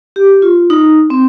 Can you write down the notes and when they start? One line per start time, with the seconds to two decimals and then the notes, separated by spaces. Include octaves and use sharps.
0.16 G4
0.42 F4
0.70 D#4
1.10 C4